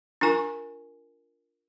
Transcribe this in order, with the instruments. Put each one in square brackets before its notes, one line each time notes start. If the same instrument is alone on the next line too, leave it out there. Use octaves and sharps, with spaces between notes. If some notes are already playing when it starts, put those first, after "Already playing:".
[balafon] D4 F4 A#4 G#5 C#6